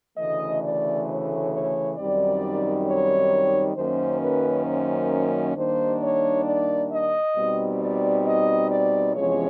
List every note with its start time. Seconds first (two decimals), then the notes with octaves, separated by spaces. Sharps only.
0.17 D2 C#3 E3 A3 D#5
0.63 D5
1.07 C#5
1.52 C#5
1.96 F#2 D#3 G3 C4 D#4 D5
2.87 C#5
3.76 F#2 D#3 F#3 A#3 C#4 C5
4.21 B4
4.66 C5
5.56 D#2 D#3 G3 A#3 D4 C5
6.01 C#5
6.45 D5
6.91 D#5
7.35 B2 G3 C4 D#4
7.80 D5
8.25 D#5
8.70 D5
9.15 E2 C3 F3 G#3 C#4 C#5